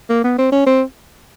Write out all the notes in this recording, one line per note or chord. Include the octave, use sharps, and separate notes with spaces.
A#3
B3
C4
C#4
C4